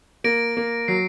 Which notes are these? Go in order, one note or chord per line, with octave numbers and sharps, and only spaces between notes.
A#3 A#6 D7
A#3
F#3 C7